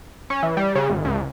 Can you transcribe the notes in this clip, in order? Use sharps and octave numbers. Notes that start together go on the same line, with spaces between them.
C#4
E3
G3
C#3
G#1
C#2